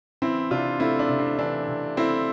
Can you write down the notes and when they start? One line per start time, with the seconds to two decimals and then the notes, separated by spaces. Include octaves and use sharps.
0.22 E3 C4 E4
0.51 C3 D4 F4
0.80 A3 C4 E4
0.99 D4
1.09 C3
1.19 C4
1.39 E3 D4
1.68 C3
1.97 A3 C4 E4